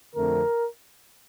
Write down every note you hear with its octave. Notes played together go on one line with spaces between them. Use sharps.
F2 D3 A3 C4 A#4